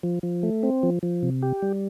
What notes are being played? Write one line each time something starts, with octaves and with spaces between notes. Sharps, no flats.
F3
F3
A3
C4
F3
F3
C3
G4
G3